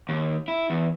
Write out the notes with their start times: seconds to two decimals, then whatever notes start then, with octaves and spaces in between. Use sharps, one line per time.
0.09 D#2
0.48 E4
0.70 E2